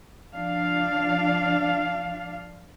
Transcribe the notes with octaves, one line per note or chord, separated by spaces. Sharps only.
F3 D4 F5